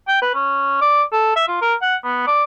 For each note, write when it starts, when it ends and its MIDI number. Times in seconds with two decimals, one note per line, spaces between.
0.08 0.20 79
0.22 0.30 71
0.35 0.77 61
0.81 1.03 74
1.13 1.31 69
1.36 1.45 76
1.48 1.61 65
1.62 1.75 70
1.82 1.96 78
2.04 2.23 59
2.27 2.44 74